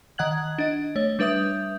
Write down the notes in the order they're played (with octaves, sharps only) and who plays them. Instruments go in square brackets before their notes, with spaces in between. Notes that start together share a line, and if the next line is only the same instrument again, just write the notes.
[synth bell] D#3 D#5 F#5 F#6 G#6 F#7
D4 D#5
A3 C#5
G3 D4 B4 E5 D#6 G6